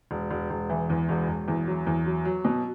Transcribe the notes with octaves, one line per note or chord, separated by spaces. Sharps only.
E1
E1
E1
E3
E2
E1
E1
E2
F#3
E2
F#3
F#3
B2